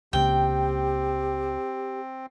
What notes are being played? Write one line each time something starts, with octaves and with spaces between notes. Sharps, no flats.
C#2 C#3 A#3 C4 G4 G5